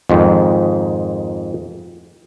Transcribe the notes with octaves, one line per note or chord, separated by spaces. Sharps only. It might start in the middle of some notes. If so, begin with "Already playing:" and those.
F2 G#2 D#3